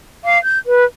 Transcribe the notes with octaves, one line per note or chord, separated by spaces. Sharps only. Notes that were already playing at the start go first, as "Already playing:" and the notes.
F5 D6
G6
B4